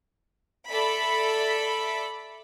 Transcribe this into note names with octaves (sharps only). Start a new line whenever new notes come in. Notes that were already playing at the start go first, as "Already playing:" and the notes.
A4 D5 E5 B5